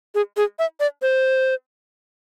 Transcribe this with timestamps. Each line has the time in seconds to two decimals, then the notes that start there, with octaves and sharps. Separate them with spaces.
0.15 G#4
0.37 G#4
0.59 E5
0.80 D5
1.02 C5